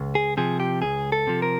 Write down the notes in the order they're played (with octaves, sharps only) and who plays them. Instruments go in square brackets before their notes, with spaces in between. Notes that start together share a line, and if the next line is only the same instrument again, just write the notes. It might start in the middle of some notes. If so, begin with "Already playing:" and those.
Already playing: [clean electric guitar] C#2
G#4
C3 F3 G#4
G4
C#2 G#4
A4
C3 F3
A#4